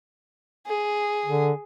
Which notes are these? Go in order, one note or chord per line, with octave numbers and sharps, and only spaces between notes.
G#4
D3